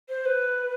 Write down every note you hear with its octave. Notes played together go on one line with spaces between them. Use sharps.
C5
B4